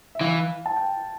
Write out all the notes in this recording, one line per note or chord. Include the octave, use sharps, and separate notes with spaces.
E5
E3 F5
A5
G5